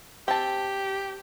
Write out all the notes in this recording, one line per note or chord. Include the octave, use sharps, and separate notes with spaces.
C4 G4 A5